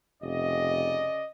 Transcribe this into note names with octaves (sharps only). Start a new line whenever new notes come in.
F1 C#3 D5 D#5